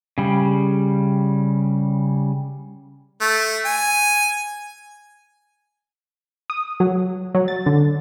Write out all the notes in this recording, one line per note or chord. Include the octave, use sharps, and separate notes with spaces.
C#3 G3
A3
G#5
D#6
F#3
F#3
A6
D3